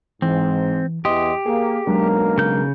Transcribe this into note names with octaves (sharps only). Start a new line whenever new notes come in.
G#2 E3 C4
E2 G4 D#5 C6 D#6
A#3 G#4
B1 F#3 G#3 A#3 D4 A#4
C#3 G6